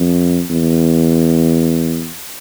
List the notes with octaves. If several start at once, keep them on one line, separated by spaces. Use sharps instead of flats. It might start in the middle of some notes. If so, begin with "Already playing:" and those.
Already playing: F2
E2